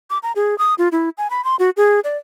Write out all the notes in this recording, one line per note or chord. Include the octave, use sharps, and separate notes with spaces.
D6
A#5
G#4
D#6
F4
E4
G#5
B5
C6
F#4
G#4
D5